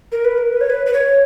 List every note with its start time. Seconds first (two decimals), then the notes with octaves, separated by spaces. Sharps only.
0.12 A#4
0.25 B4
0.38 A#4
0.53 B4
0.61 C#5
0.70 B4
0.86 B4
0.93 C#5